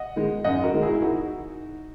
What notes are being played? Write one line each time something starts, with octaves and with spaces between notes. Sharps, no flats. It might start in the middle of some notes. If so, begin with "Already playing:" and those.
Already playing: D#5 F#5
D#3 G#3
F#2 D#5 F#5
F#4 A#4
D#3 G#3
E4 G#4
E4
D#4 F#4